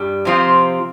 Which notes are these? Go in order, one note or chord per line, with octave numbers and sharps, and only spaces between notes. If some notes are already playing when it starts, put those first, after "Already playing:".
Already playing: G2 G3
C3 F3 C4 F4